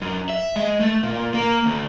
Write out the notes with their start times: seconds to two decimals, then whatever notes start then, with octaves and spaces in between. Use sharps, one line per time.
0.02 F#2
0.29 E5
0.56 G#3
0.80 A3
1.03 A#2
1.34 A#3
1.66 D2